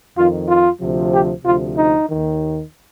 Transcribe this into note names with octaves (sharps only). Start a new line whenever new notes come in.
F2 D#3 F4
F4
D2 C3 F3
G4
D2 C3 F3 F4
D#4
D#2 D#3